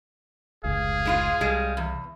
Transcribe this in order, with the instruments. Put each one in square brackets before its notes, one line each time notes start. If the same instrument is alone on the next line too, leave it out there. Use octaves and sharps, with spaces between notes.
[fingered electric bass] F1 C#2 G#2 [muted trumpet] G#4 [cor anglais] F5
[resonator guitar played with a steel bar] G#3 E4 F4
[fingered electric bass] C2 [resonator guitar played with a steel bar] G3 G#3
[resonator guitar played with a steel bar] E2